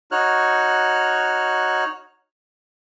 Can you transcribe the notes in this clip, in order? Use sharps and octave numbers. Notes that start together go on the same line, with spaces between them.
D#4 F#4 C#5 F6 F#6